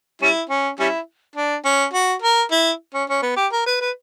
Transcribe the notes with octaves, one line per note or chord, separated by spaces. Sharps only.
G3 C#4 E4
C#4
G3 C#4 E4
D4
C#4
F#4
A#4
E4
C#4
C#4
B3
G4
A#4
B4
B4